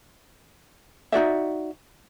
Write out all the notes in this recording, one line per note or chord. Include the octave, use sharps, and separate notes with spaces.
D#4 F#4 D5 E5